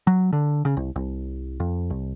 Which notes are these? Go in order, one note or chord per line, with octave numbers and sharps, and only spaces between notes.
F#3
D3
C#3
C2
C2
F2
C2